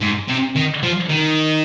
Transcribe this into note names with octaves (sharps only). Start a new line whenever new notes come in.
G#2
C3
D#3
F3
D#3